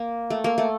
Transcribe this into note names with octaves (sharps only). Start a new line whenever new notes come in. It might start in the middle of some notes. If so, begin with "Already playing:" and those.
Already playing: A#3
A3
A#3
A3